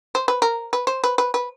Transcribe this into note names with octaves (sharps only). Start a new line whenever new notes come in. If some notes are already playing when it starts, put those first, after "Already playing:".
C5
B4
A#4
B4
C5
B4
B4
B4